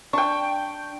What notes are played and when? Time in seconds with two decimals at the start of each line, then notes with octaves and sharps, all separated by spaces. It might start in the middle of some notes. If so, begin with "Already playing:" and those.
0.13 D4 G5 C#6